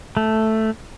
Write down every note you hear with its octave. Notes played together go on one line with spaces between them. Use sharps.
A3